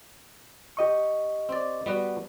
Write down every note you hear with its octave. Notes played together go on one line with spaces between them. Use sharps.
G4 D#5 C#6
C4 D5
G3 B3 F#4